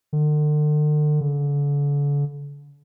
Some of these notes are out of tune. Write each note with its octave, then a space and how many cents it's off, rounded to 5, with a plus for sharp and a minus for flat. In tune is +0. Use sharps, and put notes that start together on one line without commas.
D3 +40
D3 -40